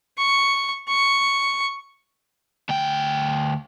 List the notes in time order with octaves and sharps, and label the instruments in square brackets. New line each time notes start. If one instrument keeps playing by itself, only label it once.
[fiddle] C#6
C#6
[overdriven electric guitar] D2 G5